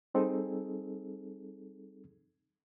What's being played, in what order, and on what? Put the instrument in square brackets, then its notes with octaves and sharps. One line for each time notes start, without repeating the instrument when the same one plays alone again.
[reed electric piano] G3 C4 D#4 G#4 A4